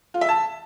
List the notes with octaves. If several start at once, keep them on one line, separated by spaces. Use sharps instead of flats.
F4
E5
A5